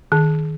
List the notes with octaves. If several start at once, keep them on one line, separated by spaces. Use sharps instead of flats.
D#3